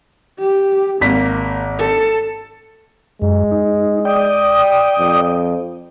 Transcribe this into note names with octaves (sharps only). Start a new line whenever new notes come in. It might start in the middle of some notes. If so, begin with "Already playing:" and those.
G4
G#1 A#3 B6
A4
F#2 G#3
D#4
D5 G5 D#6
F2